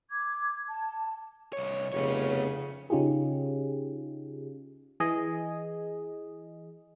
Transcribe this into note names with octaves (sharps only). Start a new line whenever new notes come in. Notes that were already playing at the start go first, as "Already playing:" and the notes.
D6 G#6
A5
C2 C#5
F1 C#3 B3 C#5
C#3 C#4 D#4 F4 G4 G#4
E3 G#4 D#5